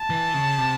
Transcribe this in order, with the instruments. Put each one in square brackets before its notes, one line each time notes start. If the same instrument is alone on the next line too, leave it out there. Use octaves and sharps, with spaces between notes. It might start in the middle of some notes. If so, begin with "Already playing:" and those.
Already playing: [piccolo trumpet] A5
[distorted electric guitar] E3
C#3
C3